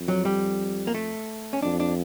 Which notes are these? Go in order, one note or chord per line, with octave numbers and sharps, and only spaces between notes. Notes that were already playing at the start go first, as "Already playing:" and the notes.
Already playing: F2
F#3
G3
A#3
A3
C#4
F2 D4
D4